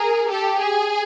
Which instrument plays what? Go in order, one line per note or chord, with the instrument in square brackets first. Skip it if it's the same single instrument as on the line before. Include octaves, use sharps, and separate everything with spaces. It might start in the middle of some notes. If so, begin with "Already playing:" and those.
Already playing: [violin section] G#4 A#4
G4 A4
G#4